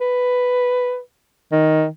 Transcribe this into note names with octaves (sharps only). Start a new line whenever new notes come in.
B4
D#3